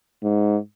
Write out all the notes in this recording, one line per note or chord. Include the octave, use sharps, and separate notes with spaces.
G#2